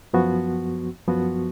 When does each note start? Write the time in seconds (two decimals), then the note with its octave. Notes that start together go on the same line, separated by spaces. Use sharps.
0.13 F#2 F3 B3 F#4
1.08 F#2 F3 B3 F#4